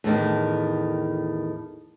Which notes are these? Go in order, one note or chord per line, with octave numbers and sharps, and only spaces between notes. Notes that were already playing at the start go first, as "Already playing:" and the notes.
E2 A2 D#3 D4